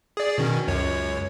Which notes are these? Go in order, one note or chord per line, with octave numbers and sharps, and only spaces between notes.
G#4 D5
B2 D#3 C#4
C#2 F#2 C#5